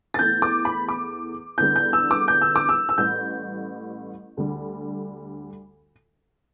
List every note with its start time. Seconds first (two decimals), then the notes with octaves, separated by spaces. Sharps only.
0.14 A6
0.19 E2 E3 A3 G6
0.42 D6
0.65 B5
0.89 D6
1.58 E2 D3 G3 G6
1.76 G6
1.93 E6
2.11 D6
2.28 G6
2.42 E6
2.56 D6
2.69 E6
2.89 E6
2.98 A1 A2 G3 G6
4.37 D2 D3 G3